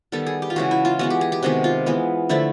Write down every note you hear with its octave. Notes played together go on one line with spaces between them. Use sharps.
D#3 G3 B3 A4
G#4
G4
F4
C#3 E3 G#3 F#4
E4
F4
E3 G#3 B3 F#4
G4
G#4
G4
C3 D#3 G#3 B3 F#4
F4
E3 G#3 B3
D3 F3 A3 E4